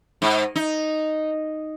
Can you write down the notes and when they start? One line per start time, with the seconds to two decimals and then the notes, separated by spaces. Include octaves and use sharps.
0.22 G#2
0.56 D#4